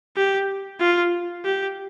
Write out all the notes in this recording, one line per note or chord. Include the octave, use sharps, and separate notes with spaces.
G4
F4
G4